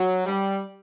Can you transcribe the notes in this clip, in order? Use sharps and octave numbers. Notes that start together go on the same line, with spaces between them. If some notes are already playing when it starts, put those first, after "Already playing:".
Already playing: F#3
G3